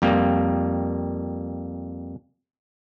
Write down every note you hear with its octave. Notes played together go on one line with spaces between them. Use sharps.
F2 G3 A#3